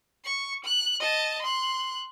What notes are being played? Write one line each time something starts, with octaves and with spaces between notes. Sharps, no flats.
C#6
F#6
D#5 A5
C6 F#6